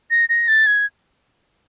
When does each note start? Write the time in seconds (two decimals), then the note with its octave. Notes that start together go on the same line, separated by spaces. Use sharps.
0.11 A#6
0.29 A#6
0.48 A6
0.66 G#6